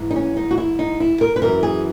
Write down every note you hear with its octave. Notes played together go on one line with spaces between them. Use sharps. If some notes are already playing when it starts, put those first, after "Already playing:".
Already playing: G#2 E3
D#4
C#4
D#4
F#4
E4
D#4
E4
A#4
B4
F#2 E3 A#4
G#4